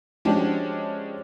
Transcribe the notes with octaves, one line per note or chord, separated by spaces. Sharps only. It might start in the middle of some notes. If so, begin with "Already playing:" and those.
F3 G#3 C#4 D4 F#4 G4